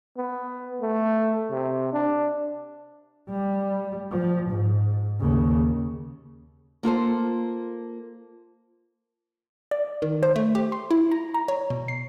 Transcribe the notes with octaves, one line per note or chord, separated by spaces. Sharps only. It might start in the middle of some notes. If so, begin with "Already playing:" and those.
B3
A3
C3
D4
G3
F3
G#2
D#2 C#3
A#3 F4 A4 C5
D5
D#3
C5
A3
G4
C6
E4
A#5
A#5
C#5
B2
C7